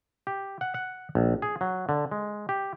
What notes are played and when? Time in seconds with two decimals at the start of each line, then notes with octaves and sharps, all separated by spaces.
0.27 G4
0.61 F#5
0.74 F#5
1.15 A#1
1.42 G#4
1.61 F#3
1.89 D3
2.11 G#3
2.49 G4